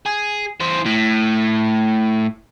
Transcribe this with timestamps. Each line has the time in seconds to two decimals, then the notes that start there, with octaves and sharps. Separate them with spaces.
0.06 G#4
0.60 E3 C5
0.86 A2